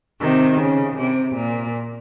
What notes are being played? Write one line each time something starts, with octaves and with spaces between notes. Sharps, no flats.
C3 D#3
C#3
C3
A#2